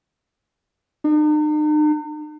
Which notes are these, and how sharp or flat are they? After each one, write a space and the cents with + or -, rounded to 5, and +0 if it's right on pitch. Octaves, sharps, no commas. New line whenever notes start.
D#4 -45